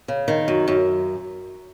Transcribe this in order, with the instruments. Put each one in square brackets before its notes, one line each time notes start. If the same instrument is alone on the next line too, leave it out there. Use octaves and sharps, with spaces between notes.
[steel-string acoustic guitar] C#3
D#3
F#2
F#2